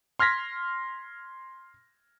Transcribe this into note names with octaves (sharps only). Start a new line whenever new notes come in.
C6 F6 G#6 A#6 B6